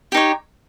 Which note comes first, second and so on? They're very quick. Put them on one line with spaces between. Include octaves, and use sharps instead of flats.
G4 D#4 C#5